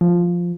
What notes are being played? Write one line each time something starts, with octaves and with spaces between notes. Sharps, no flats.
F3